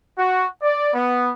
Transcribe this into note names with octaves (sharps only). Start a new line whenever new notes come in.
F#4
D5
B3